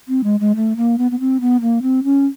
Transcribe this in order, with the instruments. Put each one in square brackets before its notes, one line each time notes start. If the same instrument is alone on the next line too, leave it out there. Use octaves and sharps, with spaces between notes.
[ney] C4
G#3
G#3
A3
A#3
B3
B3
C4
B3
A#3
C4
C#4